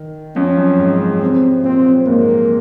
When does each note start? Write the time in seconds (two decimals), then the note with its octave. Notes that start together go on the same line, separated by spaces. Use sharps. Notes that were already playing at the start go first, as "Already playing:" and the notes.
Already playing: D#3
0.35 F2 C#4
0.57 F#2
0.78 G#2
1.00 G#2
1.21 C3 C4
1.63 A#2 C4
2.06 G#2 A#3